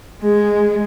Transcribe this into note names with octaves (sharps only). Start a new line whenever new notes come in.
G#3 G#4